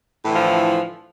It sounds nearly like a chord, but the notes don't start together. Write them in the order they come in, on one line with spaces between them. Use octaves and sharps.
A2 E3 D3 F3